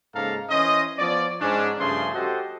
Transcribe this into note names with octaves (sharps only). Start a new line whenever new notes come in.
G#2 C#3 A#3 A4 F5 A#5
E3 C#4 C5 D#5
F3 B3 C#5 D5
G#2 C#4 D4
G2 C#3 F3 A3 G#4 C6
F#4 G4 A4 C5 D#5 F#5